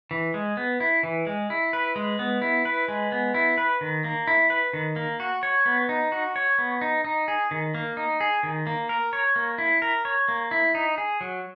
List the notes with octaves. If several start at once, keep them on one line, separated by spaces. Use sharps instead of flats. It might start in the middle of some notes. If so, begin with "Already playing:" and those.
E3
G#3
B3
E4
E3
G#3
E4
B4
G#3
B3
E4
B4
G#3
B3
E4
B4
D#3
A#3
E4
B4
D#3
A#3
F#4
C#5
B3
D#4
F#4
C#5
B3
D#4
D#4
G#4
D#3
A#3
D#4
G#4
D#3
A#3
A#4
C#5
A#3
E4
A#4
C#5
A#3
E4
D#4
G#4
F#3